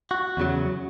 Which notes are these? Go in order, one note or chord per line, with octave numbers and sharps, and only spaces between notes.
F#4
E2 C#3 F#3